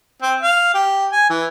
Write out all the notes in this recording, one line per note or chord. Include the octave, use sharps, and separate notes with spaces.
C4
F5
G4
G#5
E3